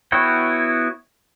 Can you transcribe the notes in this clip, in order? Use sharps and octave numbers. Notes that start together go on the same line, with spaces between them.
B3 E4 F#4 C#5 G5